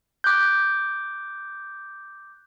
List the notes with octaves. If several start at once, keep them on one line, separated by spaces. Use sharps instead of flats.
D6 F#6 G6